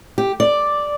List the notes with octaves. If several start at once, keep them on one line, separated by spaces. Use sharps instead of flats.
G4
D5